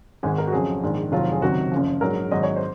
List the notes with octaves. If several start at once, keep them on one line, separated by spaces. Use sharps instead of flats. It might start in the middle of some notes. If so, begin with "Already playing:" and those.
G#1 G#2 D#3 G#5
A#4
F#4
F2 C#3 F#3 G#4
A#1 G#2 D#3
F1 F2 D#3 F#3 F4
G#4
C#2 C3 D#3 F#3 F#4
F#1 F#2 F3
A#1 G#2 F#3 A#4
G#1 G#2 F#3 D#5
C#5
C5